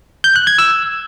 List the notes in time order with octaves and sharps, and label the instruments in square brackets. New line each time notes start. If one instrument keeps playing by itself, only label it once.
[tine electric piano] G6
F#6
G#6
E6